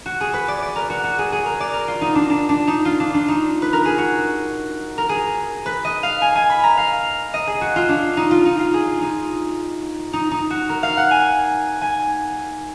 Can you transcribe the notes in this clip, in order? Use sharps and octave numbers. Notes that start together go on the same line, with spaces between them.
F#4
G#4
B4
D5
D5
A#4
F#4
F#4
G#4
G#4
A#4
D5
A#4
F4
D#4
D4
D4
D4
D#4
F4
D4
D4
D#4
B4
A#4
G#4
F#4
A#4
G#4
B4
D#5
F5
G#5
G#5
B5
A#5
F5
D#5
G#4
F#4
F4
D4
D#4
F4
D#4
F4
G#4
D#4
D#4
D#4
F#4
A#4
F5
F#5
G#5
G#5